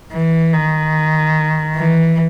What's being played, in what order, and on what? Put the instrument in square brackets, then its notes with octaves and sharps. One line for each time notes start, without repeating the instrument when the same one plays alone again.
[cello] E3
D#3
E3